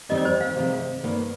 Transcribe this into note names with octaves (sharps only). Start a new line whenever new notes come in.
F2 D#3 G3 C4 D#4 D#5
D5
C5
F5
C3 D#3 G#3 C4
G2 D#3 A#3 D#4